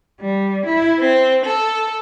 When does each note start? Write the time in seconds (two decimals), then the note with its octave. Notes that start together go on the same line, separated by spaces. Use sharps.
0.20 G3
0.66 E4
1.01 C4
1.45 A4